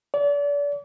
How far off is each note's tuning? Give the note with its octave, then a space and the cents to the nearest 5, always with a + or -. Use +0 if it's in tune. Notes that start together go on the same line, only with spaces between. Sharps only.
D5 -35